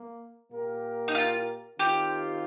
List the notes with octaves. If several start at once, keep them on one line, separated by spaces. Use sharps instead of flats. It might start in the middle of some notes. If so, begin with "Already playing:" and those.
Already playing: A#3
A#2 A#3 G4 A#4
D#4
F4
D#3 C4 F4 G4